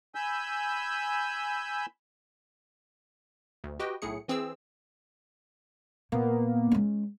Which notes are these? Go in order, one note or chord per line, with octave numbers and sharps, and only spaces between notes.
G#5 B5 E6 G6
D2
F#4 G4 B4 D#5 G5
B1 A2 A3 G#4 C#7
E3 C4 G#4 E6
A#2 A#3 B3
G#3 C#4